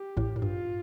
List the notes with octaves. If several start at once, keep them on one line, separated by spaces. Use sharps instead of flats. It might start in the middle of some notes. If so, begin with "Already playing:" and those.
Already playing: G4
A1 A2
A2
G2 F4